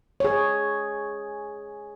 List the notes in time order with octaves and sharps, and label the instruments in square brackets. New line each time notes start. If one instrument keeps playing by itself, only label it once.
[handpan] G#4 C#5